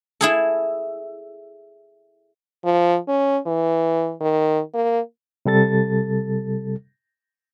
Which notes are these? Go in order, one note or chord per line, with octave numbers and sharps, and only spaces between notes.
E4 G#4 A4
F3
C#4
E3
D#3
A#3
C3 G3 A4 A6